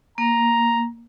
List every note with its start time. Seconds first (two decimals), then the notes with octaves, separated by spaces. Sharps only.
0.18 A#3 A#5